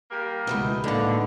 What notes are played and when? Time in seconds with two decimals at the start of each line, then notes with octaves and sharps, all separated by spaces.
0.11 G3 A#3 A#4
0.47 C#2 B2 E3 A3 B3 D#5
0.84 A2 D3 G#3 A#3 D#4